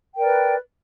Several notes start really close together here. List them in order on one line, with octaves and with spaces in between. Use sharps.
G5 A#4 D5 B4